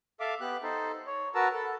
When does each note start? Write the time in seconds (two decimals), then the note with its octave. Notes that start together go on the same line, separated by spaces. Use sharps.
0.20 A4 E5 F5 D6
0.41 B3 G4 F#6
0.63 D#4 A4 C5
1.07 C#5
1.35 F#4 A#4 B4 A5 A#5 E6
1.54 A4